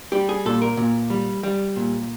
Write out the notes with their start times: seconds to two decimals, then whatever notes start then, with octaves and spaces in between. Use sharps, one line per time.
0.12 G3 G4
0.29 G#4
0.46 A#2 A4
0.62 A#4
0.77 A#2
1.10 G3
1.43 G3
1.76 A#2